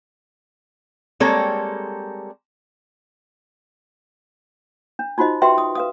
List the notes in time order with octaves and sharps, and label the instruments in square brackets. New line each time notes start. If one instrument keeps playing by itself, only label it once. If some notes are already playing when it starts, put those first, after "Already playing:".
[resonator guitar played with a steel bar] G3 G#3 A#3 C4 A4 C#5
[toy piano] D4
D#4 F4 F#4 C5 D#5
F#4 G4 B4 E5 G5 C6
D#6
B4 F5 D#6